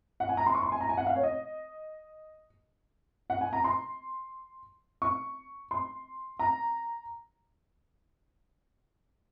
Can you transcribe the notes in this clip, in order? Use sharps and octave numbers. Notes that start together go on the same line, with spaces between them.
F#5
G#5
A#5
C6
C#6
C6
G#5
A#5
G#5
F#5
F5
C#5
D#5
F#5
G#5
A#5
C6
C#6
C6
A#5